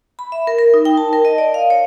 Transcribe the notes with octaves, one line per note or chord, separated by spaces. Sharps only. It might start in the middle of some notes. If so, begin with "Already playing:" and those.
B5
E5
A#4
A#4
D#4
G5
A5
A#4
D#5
D5
F5
C#5